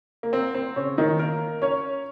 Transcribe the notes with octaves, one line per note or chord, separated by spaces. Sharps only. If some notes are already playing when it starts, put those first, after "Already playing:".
A#3
C4
C4
C#3 C#4
D#3 D#4
A#3 A#4
C#4 C#5